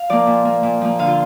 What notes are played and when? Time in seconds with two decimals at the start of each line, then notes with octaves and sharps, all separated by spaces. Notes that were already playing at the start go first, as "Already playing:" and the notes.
Already playing: F5
0.09 F3 A#3 D5
0.27 A#2
0.45 A#3
0.63 A#2
0.81 F3 A#3
0.99 D3 F5
1.07 F4